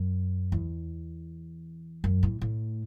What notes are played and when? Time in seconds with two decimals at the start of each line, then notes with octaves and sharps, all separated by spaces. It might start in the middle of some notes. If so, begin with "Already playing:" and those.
Already playing: F#2
0.52 E2
2.04 F#2
2.23 A2
2.41 A2